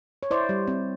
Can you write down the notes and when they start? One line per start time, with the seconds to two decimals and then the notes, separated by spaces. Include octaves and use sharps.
0.23 C#5
0.31 E4 C5 D5
0.49 G3
0.68 C4